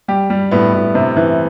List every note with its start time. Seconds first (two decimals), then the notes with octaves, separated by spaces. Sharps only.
0.08 G3 G4
0.30 G3
0.51 A2 B3
0.73 A2
0.95 C3
1.17 E3